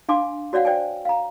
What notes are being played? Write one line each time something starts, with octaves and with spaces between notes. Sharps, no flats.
D4 F5 G#5 C6 D6
F#4 C#5 D5 F5 F#5
C5 D5 G5 G#5
F5 A#5